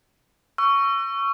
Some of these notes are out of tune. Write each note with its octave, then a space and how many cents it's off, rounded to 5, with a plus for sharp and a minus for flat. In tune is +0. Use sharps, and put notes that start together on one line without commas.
C#6 +10 E6 +40